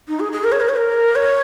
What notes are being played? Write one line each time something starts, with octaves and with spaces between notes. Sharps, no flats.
D#4
G#4
G#4
A#4
C#5
A#4
C#5
A#4
C#5